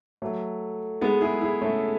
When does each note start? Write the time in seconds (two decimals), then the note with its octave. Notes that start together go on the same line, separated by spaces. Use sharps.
0.22 F#3 A3
1.01 G#3 B3
1.21 E4 G#4
1.41 E4 G#4
1.61 A3 C#4